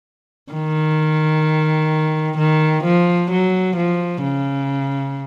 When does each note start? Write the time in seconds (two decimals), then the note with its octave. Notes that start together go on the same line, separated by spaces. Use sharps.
0.52 D#3
2.38 D#3
2.84 F3
3.31 F#3
3.77 F3
4.23 C#3